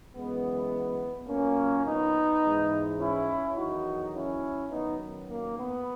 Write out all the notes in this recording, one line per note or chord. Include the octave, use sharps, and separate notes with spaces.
F#2 E3 G#3 B3
A#2 F#3 A#3 C#4
B3 D#4
G#2 E3 G#3
C#4 E4
E2 D#3 F#3 D#4 F#4
C#4 E4
F#2 D#3 F#3 B3 D#4
A#3
B3